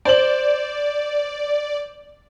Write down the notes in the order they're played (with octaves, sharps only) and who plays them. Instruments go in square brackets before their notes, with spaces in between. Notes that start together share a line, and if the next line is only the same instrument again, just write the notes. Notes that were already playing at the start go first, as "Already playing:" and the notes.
[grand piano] C5 F#7 [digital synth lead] D5